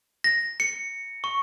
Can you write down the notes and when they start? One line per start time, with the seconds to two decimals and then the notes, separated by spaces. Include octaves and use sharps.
0.24 A#6
0.60 C#7
1.24 C#6